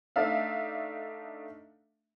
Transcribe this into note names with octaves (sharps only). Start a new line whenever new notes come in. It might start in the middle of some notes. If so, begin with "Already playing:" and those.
A3 D4 D#4 E5 F5